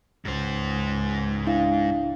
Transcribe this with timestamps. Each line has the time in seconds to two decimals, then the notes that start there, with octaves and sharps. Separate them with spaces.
0.25 C#2 G#2 C5
1.47 D4 E4 F5